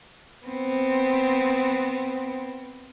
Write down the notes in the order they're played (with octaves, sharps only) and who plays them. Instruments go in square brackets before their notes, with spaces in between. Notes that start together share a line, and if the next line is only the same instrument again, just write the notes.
[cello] B3 C4